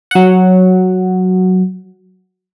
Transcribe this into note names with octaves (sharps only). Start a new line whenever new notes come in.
F#3 F#5